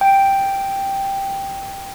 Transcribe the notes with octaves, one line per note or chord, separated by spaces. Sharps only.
G5 D7